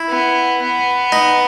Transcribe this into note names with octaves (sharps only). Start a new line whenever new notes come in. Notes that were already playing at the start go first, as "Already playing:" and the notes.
Already playing: E4
B3
B3
D#4